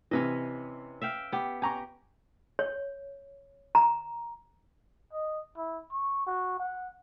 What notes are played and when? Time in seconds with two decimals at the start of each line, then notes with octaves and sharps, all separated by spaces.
0.11 C3 E3 C#4 B4 D#5
1.02 E5 F5 G5
1.32 B3 G4
1.62 G4 G#5 A#5 C#6
2.59 C#5
3.75 A#5
5.13 D#5
5.57 E4
5.92 C#6
6.27 F#4
6.59 F#5